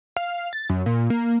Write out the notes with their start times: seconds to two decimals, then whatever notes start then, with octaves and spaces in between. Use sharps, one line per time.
0.17 F5
0.53 A6
0.70 F#2
0.86 A#2
1.10 A#3